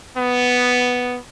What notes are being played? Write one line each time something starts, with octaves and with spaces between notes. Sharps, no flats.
B3